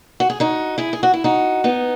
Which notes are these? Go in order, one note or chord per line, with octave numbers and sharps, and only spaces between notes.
F#4
G#4
D#4 F#4
E4 G#4
G#4
F#4
E4
D#4 F#4
B3 D#4